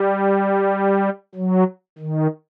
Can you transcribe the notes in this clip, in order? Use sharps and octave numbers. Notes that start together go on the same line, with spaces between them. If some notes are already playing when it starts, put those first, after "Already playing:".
Already playing: G3
F#3
D#3